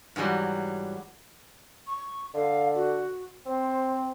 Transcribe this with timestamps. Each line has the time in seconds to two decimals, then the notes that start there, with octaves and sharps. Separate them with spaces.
0.16 G#2 E3 F#3 G3
1.87 C#6
2.34 D3 F5
2.75 F#4
3.46 C4 C5